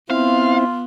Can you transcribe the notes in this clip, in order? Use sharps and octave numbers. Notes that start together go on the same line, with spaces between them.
B3 C4 E4 F4 F5